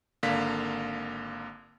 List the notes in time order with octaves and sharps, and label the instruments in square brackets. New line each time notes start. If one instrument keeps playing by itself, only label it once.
[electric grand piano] G#1 D3 A#3 F5 B6